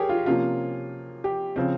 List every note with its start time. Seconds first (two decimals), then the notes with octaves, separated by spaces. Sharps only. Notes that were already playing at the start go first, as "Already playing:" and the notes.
Already playing: G4 G#4 A#4 C#5
0.09 F4
0.26 C3 F3 A#3 C#4 F4
1.24 G4
1.56 C#3 F3 C4